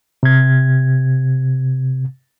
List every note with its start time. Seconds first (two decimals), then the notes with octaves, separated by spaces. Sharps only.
0.23 C3 G#6